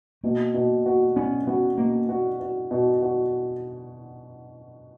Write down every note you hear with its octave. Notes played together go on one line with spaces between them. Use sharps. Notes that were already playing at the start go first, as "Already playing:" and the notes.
B2 A#3
B2
F#4
B3 C#4
B3 F#4
B2 A#3
F#4
F#4
B2
F#4